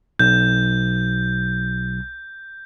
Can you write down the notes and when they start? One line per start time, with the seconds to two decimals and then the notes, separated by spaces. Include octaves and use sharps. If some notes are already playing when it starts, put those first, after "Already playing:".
0.19 B1 G6